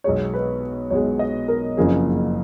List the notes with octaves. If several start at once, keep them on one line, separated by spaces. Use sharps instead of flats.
B1 B2 G#3 C#5
B4
B1 B2 G#3 C#5
D#5
A#4
F#1 F2 C#3 F3 A#3 G#4